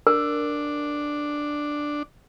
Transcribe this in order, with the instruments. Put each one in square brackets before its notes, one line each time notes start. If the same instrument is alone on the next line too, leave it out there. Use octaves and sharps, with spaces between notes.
[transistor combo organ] D4 [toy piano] A#4